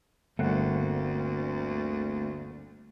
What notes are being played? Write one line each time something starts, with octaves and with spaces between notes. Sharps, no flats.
G1 D2 A3 A#3 C4 F#5